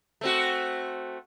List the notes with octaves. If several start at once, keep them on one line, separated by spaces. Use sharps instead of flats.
A3 C4 F#4